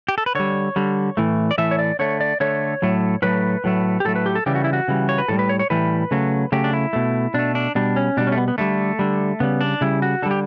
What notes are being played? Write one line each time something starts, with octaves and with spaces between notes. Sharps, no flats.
G4
A4
B4
D3 G3 C#5
D3 G3
A2 E3 A3
D5
A2 E3 A3 E5
C#5
D5
D3 A3 C#5
D5
D3 A3 C#5
A2 F#3 A3
A2 F#3 A3 B4
A2 F#3 A3
G4
A2 F#3 A3 A4
B4
G4
A4
C#3 E3 G3 G4
F#4
E4
F#4
C#3 E3 G3
C#5
B4
A2 E3 G3 A4
B4
C#5
C#5
A2 E3 G3 B4
C#3 F#3 A3
C#3 F#3 A3 G4
D4
E4
B2 A3
B2 A3 D4
D4
B2 G3 D4
C#4
B2 G3 D4
C#4
A3
B3
B3
D3 G3 A3
D3 G3
C#3 G3 B3
D4
C#3 G3 E4
F#4
D3 G3 A4
G4